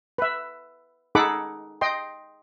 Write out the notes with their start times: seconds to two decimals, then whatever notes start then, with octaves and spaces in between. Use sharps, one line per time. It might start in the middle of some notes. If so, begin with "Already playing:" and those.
0.18 B4 E5
1.15 D#4 G#4 A4 F#5 B5 D6
1.81 D#5 G5 C6